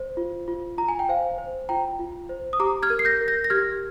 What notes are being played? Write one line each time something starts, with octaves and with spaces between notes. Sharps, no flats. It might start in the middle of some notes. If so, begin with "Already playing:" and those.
Already playing: C5
F4
F4
F4 A#5
G#5
G5
C5 F5 G#5
C5
F4 G5 A#5
F4
C5
D#6
G4 A#5 D6
F6 G#6
A#4
C7
G6 A#6
A#4
G6 A#6
A#6
G4 F6 G#6